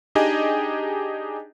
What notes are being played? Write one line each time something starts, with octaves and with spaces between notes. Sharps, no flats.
D4 D#4 G4 G#4 D#5 G#5